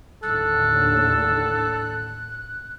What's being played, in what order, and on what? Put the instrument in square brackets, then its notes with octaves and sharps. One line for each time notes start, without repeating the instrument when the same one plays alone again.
[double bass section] D#2 A2 D3 [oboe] A4 [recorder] F#6